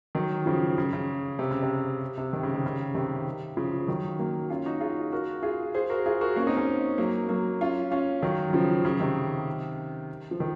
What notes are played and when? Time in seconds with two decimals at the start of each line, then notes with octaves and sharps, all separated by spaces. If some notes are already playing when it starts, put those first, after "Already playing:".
0.15 D#3 F#3
0.46 C#3 F3
0.78 C#3
0.93 C#3
1.39 C3
1.51 C#3
1.63 C3
2.18 C3
2.33 D#3
2.43 C#3
2.55 C3
2.66 C#3
2.95 C3 D#3
3.57 C#3 F3
3.87 D#3 F#3
4.19 F#3 A#3
4.50 C#4 F4
4.66 D#4 F#4
4.80 F4 G#4
5.12 F#4 A#4
5.43 F4 G#4
5.75 G#4 C5
5.90 F#4 A#4
6.06 F4 G#4
6.21 F#4 A#4
6.36 A#3 C#4
6.47 C4 D#4
6.56 A#3 C#4
6.98 F#3 A#3
7.29 F#3 A#3
7.61 C#4 F4
7.91 C#4 F4
8.22 D#3 F#3
8.48 F#3
8.53 C#3 F3
8.85 C#3
9.00 C3 D#3
10.31 F3
10.40 D#3